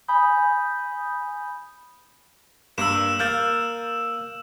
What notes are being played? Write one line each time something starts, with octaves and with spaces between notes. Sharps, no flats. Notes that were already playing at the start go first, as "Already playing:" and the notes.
G#5 B5 D#6 G6
G2 A#3 E6 E7
A#3 F6 G6 A6